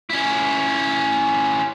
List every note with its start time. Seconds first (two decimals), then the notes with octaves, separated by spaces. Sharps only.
0.10 C#4 E4